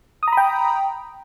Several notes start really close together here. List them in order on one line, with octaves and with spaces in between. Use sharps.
D#6 A#5 B5 G5